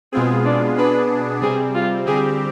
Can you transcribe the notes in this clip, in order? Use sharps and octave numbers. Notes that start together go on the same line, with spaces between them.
B2 G#3 B3 C4 F4 G#4
D4
B2 B3 D4 G#4 B4
C3 G3 C4 G#4
F4
D3 G3 C4 G4 G#4